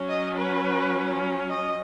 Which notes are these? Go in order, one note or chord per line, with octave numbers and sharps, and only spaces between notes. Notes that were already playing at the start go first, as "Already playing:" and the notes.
Already playing: F#3 C#4
D#5
B4
D#5